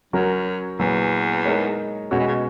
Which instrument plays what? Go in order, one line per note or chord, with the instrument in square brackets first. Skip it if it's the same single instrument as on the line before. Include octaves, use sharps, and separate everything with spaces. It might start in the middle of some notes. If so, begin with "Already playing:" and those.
[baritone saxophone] F#2 [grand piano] F#3 C#4 F#4 A#4 C#5
[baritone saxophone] E2 [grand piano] A#2 F#3 B3
[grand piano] G#3 D#4 A#4 C#5
[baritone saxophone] F#2 [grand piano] B2 G#3 C#4 F#4
[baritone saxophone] E3
C#3